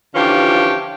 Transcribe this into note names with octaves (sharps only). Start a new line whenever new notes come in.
D3 E3 F3 C#4 F4 G4